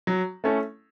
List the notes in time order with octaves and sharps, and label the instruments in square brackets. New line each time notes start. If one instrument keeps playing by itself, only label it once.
[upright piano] F#3
A3 C#4 E4 A4